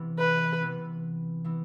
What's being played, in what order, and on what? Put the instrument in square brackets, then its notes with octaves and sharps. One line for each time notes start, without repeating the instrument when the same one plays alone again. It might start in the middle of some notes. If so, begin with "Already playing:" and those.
Already playing: [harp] C3 E3 B3 E4
[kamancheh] B4
[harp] C3 E3 B3 E4
E3 B3 E4